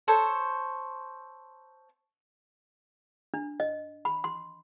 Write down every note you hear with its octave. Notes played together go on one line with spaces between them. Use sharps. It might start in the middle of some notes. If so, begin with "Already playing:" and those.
A4 C5 C#5
D4
D#5
B5
C6